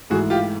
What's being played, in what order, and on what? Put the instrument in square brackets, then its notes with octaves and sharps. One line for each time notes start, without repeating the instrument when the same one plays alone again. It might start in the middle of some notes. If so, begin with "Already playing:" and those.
[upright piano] G#2 E3 A3 [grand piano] F#4 G#4
[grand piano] F4 G4